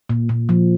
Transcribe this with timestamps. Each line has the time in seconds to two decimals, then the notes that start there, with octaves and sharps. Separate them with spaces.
0.09 A#2
0.29 A#2
0.49 F3